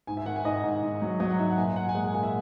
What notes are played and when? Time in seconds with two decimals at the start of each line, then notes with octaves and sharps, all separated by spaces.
0.07 G#2 G#5
0.17 E5
0.26 D#3 F#5
0.36 G#5
0.45 G#2 D#5
0.64 G#2
0.83 G#2
1.02 F#3
1.20 F#3 D#5
1.31 F#5
1.39 G#2 E5
1.51 F#5
1.58 A#2 G#5
1.76 A#2 F#5
1.89 G#5
1.95 G#3 F#5
2.04 G#5
2.14 A#2 G#5
2.23 E5